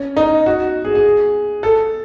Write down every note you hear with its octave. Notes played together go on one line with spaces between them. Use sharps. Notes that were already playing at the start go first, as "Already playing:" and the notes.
Already playing: C#4
D#4
F#4
G#4
G#4
A4